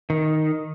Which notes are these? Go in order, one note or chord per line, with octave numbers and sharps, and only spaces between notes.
D#3